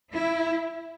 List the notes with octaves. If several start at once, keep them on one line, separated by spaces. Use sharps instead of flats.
E4